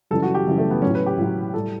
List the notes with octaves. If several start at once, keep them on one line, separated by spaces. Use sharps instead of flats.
F#2 C#3 E3 G3 A4
F#4
G4
F#2 C#3 E3 G3
A3
B3
A2 F#3 C#4
B4
G4
A2 F#3
A2 G3 A4